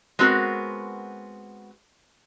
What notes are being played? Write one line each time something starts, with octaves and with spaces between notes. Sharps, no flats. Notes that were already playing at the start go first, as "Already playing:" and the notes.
G#3 B3 C4 F#4 A#4